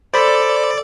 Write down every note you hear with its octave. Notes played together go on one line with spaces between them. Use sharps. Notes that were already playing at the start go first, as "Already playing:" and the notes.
A4 C5 D5 B5